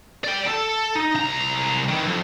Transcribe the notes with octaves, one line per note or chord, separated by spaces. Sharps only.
D5 G5
A4
D#4
C2 A#5
D#3 E3
F2